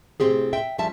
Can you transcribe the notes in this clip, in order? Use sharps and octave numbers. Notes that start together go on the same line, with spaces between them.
A2 C3 F3 C4 G4 G#4
E5 G5
F3 G3 C#4 E5 A5